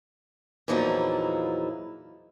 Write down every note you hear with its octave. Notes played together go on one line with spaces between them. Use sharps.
E2 A#2 F3 F#3 D#4 E4